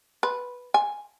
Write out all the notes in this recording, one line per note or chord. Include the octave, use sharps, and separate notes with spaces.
B4
G#5